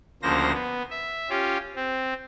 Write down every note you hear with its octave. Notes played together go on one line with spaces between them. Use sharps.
D2 C#3 F3 A#3 C5 A#6
B3
E5
C#4 F4 G4
C4